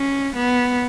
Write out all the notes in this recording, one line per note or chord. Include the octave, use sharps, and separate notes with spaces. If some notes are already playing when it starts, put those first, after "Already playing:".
Already playing: C#4
B3